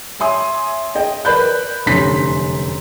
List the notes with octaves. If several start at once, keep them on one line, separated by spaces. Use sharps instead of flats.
C#5 E5 G#5 C6 D#6
G#4 D#5 G5
A#4 B4 D5 B5 F#6 G6
F1 F#2 D3 C6 B6